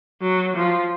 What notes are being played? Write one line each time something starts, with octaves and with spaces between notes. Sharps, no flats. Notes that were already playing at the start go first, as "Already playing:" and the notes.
F#3
F3